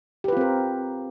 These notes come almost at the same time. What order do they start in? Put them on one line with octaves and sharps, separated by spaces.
G4 B4 F4 C4 A#4